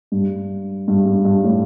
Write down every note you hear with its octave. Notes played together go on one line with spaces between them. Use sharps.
G2
G2
G2
G2
A2